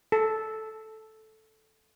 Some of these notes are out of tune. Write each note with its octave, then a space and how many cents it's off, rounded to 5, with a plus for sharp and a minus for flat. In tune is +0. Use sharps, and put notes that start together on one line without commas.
A4 -5